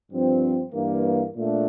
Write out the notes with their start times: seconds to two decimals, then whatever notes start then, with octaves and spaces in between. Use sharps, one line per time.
0.11 G2 F3 C4
0.72 G2 E3 A#3
1.36 A#2 A3 D4